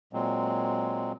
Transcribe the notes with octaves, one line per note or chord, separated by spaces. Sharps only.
A#2 F#3 G#3 C4